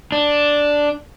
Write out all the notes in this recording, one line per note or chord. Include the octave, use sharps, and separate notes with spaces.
D4